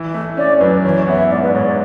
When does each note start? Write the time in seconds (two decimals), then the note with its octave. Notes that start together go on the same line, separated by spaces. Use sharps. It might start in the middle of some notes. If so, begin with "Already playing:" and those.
Already playing: E3
0.14 A3
0.37 C#4 D5
0.60 F#2 B4
0.84 E3 C#5
1.07 B3 E5
1.30 G#2 D5
1.42 B4
1.54 G#2 C#5
1.65 D5